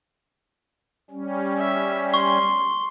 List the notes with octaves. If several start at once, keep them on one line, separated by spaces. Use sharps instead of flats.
G3 C#4
E5
C6 C#6